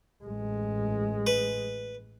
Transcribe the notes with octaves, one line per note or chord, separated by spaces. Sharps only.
A1 G#3
B4